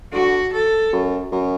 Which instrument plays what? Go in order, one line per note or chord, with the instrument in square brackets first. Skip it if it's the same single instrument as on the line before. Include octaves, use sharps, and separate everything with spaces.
[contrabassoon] D3 [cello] F#4
[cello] A4
[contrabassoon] F#2
F#2